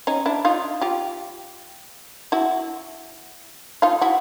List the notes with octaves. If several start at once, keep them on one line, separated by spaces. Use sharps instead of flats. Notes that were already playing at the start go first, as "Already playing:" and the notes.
C#4 D#4
D4 E4
D#4 F4
F4 G4
E4 F#4
D#4 F4
E4 F#4